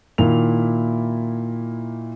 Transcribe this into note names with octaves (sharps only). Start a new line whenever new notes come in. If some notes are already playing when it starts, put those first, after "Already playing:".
A#2 D#3 A#3 E4 F7